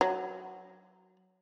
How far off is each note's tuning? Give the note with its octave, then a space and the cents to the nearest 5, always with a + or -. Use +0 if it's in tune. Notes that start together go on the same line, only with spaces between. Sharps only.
F#3 +5